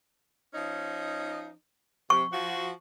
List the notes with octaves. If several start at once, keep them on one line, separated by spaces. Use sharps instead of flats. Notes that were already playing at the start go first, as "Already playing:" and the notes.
F3 C#4 D#4
C3 C#6
F3 F#4